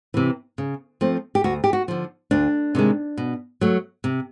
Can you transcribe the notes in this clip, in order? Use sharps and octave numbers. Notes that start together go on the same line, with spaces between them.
C3 E3
C#3
F3 A3 C4
G4
D2 F#4
G4
F#4
D3 F3
D2 D4
C3 D#3 G#3
B2
F#3 A3
C3